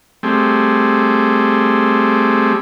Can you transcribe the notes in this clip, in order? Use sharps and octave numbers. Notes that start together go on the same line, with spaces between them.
G3 A3 C4 G#4